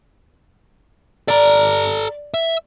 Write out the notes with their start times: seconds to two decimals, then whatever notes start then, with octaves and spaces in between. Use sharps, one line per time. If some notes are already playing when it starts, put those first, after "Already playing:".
1.28 A4 D5 A#5
2.34 E5